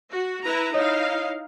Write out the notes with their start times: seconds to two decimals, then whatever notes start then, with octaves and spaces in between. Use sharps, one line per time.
0.11 F#4
0.44 E4 B4 A#5
0.74 D#4 E4 C#5 D#5 F5 D#6